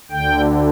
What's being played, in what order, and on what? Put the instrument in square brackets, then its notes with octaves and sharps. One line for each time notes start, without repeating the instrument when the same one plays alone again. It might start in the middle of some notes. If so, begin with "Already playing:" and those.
[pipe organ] D2 D3 G5